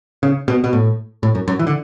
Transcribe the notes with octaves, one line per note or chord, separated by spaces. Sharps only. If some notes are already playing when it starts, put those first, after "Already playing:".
C#3
B2
B2
A2
A2
F#2
F#2
E3
D3